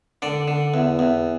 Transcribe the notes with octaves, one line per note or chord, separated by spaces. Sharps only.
D3 D5
D3
E2
E2